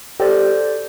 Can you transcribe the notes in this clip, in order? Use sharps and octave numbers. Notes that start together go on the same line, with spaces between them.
G4 A4 C5 D5